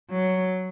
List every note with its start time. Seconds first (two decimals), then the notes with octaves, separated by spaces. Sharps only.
0.10 F#3